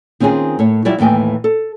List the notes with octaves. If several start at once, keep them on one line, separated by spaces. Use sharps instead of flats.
D#3 C4 C#4 F4 G#4
A2 C#5
F#3 G3 E4 F4 D5 E5
D#2 A2 E3 G5 G#5
A4